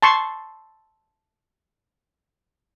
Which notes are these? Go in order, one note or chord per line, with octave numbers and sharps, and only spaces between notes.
A5 C6 C#6